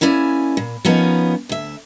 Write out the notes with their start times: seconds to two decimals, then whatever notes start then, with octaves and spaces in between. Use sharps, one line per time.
0.01 A#3 C#4 E4 D5 G#5
0.57 A#2
0.85 F3 A#3 B3 C#4 D#4
1.49 D2 E5